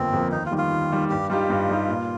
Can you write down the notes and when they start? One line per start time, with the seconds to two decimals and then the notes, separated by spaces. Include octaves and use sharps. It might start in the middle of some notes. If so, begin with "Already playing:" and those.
Already playing: G1 F2 F3 A#3 C4
0.13 F2 F3 A#3
0.32 D#2 D#4
0.46 F4
0.51 D#3 G3
0.58 F4
0.71 D#2
0.91 D#3 G3
1.10 G2 G4
1.30 G3 D#4 F4 G4
1.50 G2
1.69 G3 D#4 G4
1.88 A#2